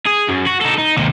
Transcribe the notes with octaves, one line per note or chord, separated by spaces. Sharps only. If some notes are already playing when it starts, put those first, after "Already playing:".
G#4
F#2
F#4
D#4 A4
D#4
D#2 C3